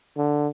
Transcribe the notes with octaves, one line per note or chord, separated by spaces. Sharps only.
D3